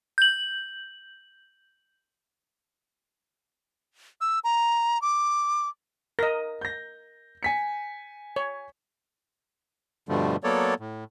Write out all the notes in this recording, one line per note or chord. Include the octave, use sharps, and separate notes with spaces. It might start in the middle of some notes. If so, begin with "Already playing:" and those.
G6 F#7
E6
A#5
D6
A#4 D#5 A#6
G6 A#6
G#5 B6 C#7
C#5
G2 B2 D3 F3 G3 A3
F#3 A#3 B3 A4 C#5 D5
A2